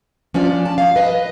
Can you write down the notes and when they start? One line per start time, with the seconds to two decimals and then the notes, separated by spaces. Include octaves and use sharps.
0.34 F3 C#4 D4 F4 D5
0.66 A5
0.78 F5
0.96 B4 D#5